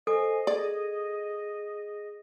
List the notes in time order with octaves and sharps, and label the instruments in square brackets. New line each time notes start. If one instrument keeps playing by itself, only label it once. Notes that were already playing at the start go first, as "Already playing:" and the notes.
[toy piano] A4 [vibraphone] C5 G#5 [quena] D#5
[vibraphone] G#4 [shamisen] D5